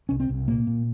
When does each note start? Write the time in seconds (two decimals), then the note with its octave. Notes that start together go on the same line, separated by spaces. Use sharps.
0.09 C2 C#4
0.20 C4
0.29 C2
0.48 A#2 A#3
0.67 A#2